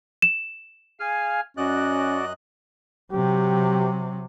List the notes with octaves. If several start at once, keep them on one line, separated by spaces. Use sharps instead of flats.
E7
G#4 F5 G#5 F6
F#2 C#4 F#4 D5 D#5 F#6
C3 F#3 G4